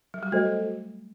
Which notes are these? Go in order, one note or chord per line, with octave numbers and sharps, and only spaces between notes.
F#3
G3
A3 F#4 A4 C5 D#5